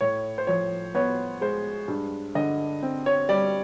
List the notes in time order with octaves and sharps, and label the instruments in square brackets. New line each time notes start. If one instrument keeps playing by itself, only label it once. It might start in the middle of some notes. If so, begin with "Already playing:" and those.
[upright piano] A2 C#5
C5
F3 C#5
B3 C#5
G#3 C5
G2
D3 D#5
C4
C#5
G3 D5